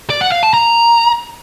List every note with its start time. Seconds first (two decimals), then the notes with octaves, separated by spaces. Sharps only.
0.10 D5
0.21 F#5
0.32 F5
0.43 A5
0.54 A#5